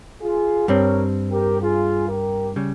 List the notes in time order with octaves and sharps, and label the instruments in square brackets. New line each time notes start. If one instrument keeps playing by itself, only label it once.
[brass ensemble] F4 G#4
[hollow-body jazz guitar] G2 G3 C4 [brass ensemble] A#4 C#5
[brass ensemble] G4 A#4
F4 G#4
G4 A#4
[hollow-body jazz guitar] C#3 G3